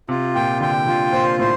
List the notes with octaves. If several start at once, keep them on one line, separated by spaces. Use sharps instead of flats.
C3 F4
A#2 G5
D3 G5
D3 F4
A#2 C5
A2 C5